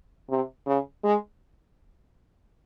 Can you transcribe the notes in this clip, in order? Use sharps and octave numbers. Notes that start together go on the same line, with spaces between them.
C3
C#3
G#3